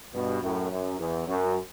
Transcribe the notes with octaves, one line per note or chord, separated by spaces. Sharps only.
G2 B2
F#2 A2
F#2
E2
F#2